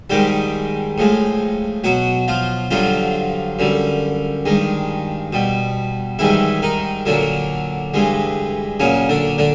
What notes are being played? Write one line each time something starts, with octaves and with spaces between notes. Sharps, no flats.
G#2 D#3 G3 G#3 G4
A2 F3 G#3
B2 F#3 F#4
F3 F4
G2 D3 F3 F#3 F4
F#2 D3 G3
G2 D#3 G#3
B2 G3
G#2 D#3 E3 G3 E4
D#3 D#4
A#2 D3 F#3 D4
G2 E3 G#3
A#2 C#3 F#3 C#4
D3 D4
D3 D4